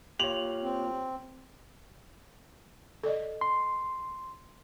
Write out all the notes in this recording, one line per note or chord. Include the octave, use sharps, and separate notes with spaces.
A#3 F4 G4 C#5 F7 F#7
C4
A4 D5 D#5
C6